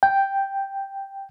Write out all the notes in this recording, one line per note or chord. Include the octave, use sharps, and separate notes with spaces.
G5